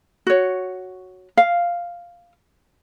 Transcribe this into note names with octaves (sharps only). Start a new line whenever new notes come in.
F#4 C#5
F5